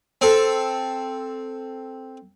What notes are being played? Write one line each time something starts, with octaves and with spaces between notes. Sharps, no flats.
C4 A4